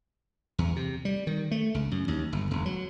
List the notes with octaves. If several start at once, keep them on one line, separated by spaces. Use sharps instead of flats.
E2
C3
G3
D#3
A3
C#2
F#2
D#2
G1
E1
F#3